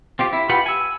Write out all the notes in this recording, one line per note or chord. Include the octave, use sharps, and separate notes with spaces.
C4 F4 G4
E4
F4 G4 B4 F#5 B5
G#5 E6